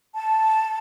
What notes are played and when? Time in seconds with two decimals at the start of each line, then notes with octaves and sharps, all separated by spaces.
0.15 A5